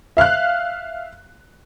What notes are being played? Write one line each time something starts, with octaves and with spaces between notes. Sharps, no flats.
E5 F5 F6 F#6